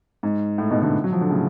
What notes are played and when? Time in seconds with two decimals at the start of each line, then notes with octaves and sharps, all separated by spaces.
0.23 G#2
0.58 A2
0.71 G#2 B2
0.82 B2 D3
1.04 F#3
1.13 F3
1.21 D3
1.30 A2 C#3